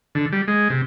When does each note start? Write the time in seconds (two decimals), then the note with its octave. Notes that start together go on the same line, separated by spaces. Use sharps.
0.15 D3
0.32 G3
0.48 G#3
0.70 C3